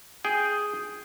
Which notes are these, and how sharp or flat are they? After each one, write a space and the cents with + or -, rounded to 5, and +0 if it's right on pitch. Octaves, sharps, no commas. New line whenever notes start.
G#4 +0 G5 +0